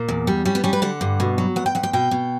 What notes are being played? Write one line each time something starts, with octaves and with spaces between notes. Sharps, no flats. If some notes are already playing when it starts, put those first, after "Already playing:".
Already playing: A#2
E2
G3
G3 C#4
B3
G3 C#4
B4
D3 F#5
G2
B2
F#3
E2 F#5
G5
E2 F#5
G5
B2 G5
B2